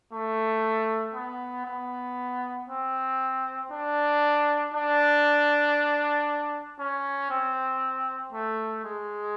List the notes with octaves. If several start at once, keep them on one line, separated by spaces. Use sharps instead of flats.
A3
B3
B3
C4
D4
D4
C#4
C4
A3
G#3